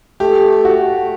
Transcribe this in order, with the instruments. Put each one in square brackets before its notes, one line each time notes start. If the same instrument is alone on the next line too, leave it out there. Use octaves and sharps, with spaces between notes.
[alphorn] A3 [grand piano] G4
[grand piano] F#4